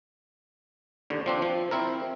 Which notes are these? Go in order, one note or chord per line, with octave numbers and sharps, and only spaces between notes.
D#2 D3
F3 C4 D4
F3
C4 E4 A#4